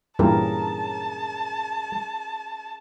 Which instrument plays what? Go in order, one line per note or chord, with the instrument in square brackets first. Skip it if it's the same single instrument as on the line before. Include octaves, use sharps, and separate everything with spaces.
[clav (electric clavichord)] G2 A#2 E3 [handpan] C#4 G#4 A#4 [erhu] A5